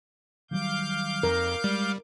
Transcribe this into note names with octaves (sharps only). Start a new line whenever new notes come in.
D#3 F#3 G3 F5 D6 G6
F2 A#4
G3 G#3